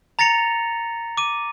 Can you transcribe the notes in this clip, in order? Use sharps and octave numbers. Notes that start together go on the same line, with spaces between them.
A#5 A6 A#6 C#7 F7
D6 D#7